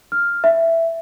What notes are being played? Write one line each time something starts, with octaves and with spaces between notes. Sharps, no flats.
F6
E5